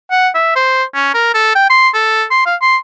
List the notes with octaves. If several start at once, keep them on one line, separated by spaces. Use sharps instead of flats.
F#5
E5
C5
C#4
A#4
A4
G5
C6
A4
C6
F5
C6